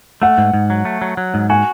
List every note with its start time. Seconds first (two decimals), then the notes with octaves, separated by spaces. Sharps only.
0.22 A3 F#5
0.38 G#2
0.53 G#2
0.70 F#3
0.85 A3
1.02 F#3
1.17 F#3
1.34 G#2
1.50 F#4 G#5